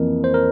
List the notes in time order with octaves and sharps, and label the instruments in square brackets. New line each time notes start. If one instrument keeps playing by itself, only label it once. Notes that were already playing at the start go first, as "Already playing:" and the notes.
Already playing: [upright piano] F2 E3 A#3 [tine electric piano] A#4
[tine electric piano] C5
A#4